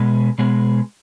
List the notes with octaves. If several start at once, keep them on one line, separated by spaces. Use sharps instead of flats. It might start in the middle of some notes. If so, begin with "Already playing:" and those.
Already playing: B2 G#3 B3 G#4
B2 G#3 B3 G#4